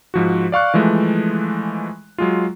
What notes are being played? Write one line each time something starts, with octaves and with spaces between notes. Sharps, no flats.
G#2 F3 F#4
D5 F5 C#6 F#6
E3 F3 G#3 A3
F#3 G#3 F4